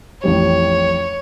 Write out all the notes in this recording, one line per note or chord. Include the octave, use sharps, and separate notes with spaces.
A1 F2 G3 C#5